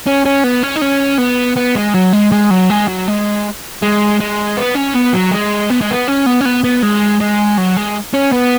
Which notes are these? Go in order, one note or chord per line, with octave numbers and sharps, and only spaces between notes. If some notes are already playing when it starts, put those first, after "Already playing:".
C#4
C#4
B3
C#4
D#4
C#4
B3
B3
G#3
F#3
G#3
G#3
F#3
G#3
F#3
G#3
G#3
G#3
B3
C#4
B3
F#3
G#3
B3
G#3
B3
C#4
B3
C#4
B3
B3
G#3
G#3
F#3
G#3
C#4
B3